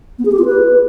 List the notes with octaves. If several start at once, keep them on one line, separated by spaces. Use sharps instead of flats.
B3
G#4
G4
F4
B4